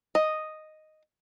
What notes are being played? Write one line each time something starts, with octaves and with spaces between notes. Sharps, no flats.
D#5